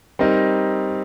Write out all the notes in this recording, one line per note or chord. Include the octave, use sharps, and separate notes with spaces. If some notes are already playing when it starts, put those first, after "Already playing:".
G3 C4 D#4 A#4 D#5